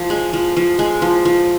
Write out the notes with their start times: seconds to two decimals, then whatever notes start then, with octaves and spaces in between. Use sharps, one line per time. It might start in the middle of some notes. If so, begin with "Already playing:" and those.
Already playing: F3
0.10 G#3
0.33 F3
0.57 F3
0.79 G#3
1.02 F3
1.25 F3